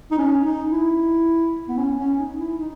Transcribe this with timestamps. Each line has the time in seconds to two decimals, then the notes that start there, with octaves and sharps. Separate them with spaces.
0.12 D#4
0.19 C#4
0.44 D#4
0.71 E4
1.69 B3
1.78 C#4
1.98 C#4
2.19 D#4
2.38 E4
2.58 D#4